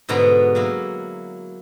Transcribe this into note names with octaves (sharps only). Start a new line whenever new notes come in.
G#2 B2 D3 B3 G#4 A#5
F#3 A#3 E4